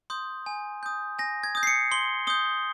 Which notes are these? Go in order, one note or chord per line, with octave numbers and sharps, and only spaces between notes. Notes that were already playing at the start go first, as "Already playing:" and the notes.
C6 D#6 G6
G#5
D#6 G6
G#5 A#6
G#6
D#6 G6
C7
C#7
C6 G7
D#6 G6 G7